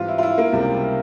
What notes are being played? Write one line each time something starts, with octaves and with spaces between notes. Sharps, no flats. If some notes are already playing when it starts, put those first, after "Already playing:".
Already playing: G#2 E3 G3 C4 F4
E4
F4
E4
A#3
C#2 C3 G3